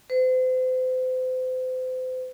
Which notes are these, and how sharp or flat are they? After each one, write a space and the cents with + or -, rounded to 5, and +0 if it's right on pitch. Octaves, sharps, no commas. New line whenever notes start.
C5 -35